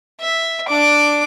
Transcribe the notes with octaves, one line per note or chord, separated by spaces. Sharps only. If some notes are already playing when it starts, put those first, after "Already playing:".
E5
D4 D6